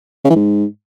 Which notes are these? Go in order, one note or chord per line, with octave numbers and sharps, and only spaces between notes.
C#3
E3
G#2